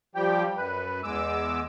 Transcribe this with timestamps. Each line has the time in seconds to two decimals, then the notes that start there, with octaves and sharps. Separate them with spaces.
0.15 F3 G3 G4 G5
0.57 F#2 B4
1.03 E2 G#3 D6 E6